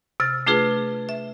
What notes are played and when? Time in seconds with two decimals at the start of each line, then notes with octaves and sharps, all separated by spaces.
0.20 C3 F6 A6
0.46 A3 D4 F4 G#4 B4
1.09 E5